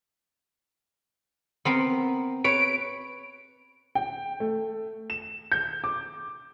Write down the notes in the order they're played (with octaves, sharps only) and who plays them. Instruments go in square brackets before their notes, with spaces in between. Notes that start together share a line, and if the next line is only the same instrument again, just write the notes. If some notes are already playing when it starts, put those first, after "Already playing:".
[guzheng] B3 C4 A#4
[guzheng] B4 C#5 [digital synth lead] D7
[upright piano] G5
A3
E7
G6
D6